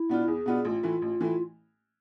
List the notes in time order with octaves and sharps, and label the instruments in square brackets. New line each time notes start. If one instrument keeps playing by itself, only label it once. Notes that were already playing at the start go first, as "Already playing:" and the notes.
Already playing: [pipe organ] E4
[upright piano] B2 B3 D4 F4
[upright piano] E2 [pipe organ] G#4
[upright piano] B2 B3 D4 F4
[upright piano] A1 [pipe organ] F4
[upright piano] A2 E3 A3 E4
A1
A2 E3 A3 E4